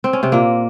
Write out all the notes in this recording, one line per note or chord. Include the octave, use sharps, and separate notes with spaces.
C4
C#4
C3 C4
A#2 A#3